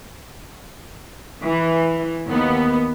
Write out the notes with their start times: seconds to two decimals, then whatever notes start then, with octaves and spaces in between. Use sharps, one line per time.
1.44 E3
2.28 D#2 B3